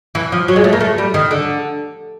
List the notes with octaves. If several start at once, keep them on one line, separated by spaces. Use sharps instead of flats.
E3
F3
F#3
G#3
A3
A#3
A3
G3
D#3
D3